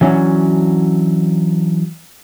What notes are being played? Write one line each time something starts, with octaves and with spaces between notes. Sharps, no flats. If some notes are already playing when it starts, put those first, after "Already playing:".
E3 F#3 C#4 D4 F#4